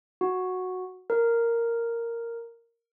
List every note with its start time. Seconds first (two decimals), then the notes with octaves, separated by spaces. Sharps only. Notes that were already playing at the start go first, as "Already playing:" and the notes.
0.21 F#4
1.10 A#4